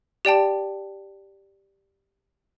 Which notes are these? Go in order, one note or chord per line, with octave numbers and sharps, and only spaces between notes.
G4 D5 G5 A5